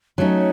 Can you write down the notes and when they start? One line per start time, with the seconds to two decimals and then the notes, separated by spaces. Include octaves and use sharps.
0.18 F#3 A3 C#4 D#4